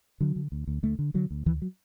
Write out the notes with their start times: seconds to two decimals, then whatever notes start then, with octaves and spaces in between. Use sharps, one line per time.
0.20 D3 F#3
0.36 D3
0.52 D2
0.67 D2
0.83 D2 A3
0.99 D3
1.14 D3 F#3
1.31 D2
1.46 D2 E3
1.62 F#3